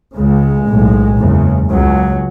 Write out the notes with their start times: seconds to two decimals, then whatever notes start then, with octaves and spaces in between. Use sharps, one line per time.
0.17 C#2 C#3 G#3
0.68 B1 A2
1.18 F#1 E2 C#3
1.69 C#2 C#3 F#3